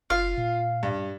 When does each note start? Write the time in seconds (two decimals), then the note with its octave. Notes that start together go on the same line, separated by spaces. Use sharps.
0.10 F#1 F4 F5
0.37 A#2
0.83 G2